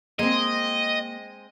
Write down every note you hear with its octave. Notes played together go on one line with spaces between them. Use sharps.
G#3 A#3 C4 D#5